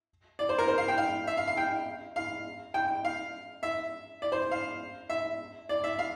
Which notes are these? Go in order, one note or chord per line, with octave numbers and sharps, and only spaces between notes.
D5
C5
A#4
C5
F5
G5
F5
E5
F5
F5
G5
F5
G5
F5
E5
D5
C5
F5
E5
D5
E5
F5